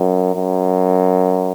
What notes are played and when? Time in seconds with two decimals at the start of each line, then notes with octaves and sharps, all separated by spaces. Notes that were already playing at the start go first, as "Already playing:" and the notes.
Already playing: F#2
0.36 F#2